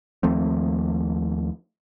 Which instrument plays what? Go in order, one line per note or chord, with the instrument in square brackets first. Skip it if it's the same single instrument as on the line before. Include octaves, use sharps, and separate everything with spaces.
[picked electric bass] D#2 F3 A3 C4